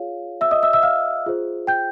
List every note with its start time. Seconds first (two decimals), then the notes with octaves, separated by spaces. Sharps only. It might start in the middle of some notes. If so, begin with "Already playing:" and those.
Already playing: F4 G#4 C#5 F5
0.41 E5 E6
0.51 D#5 D#6
0.63 E5 E6
0.73 E5 E6
0.83 F5 F6
1.26 F4 G#4 C5
1.67 G5 G6